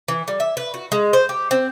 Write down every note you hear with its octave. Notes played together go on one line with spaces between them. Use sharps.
E3
G3
E5
B4
F#4
G#3
C5
G4
C4